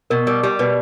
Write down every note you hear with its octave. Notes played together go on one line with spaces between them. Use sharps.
B2 A#4
G3 A#4
G3 G4
B2 B4